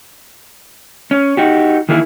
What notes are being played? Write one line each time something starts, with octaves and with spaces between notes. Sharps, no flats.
C#4
D#4 F#4 G4
D#3 E3 A#3 E4 G#4